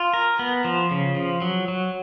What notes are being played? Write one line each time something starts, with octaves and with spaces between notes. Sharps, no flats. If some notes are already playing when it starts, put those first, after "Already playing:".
Already playing: F4
A#4
B3
F3
C#3
F3
F#3
F#3